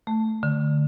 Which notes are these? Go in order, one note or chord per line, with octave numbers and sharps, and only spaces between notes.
A3
D3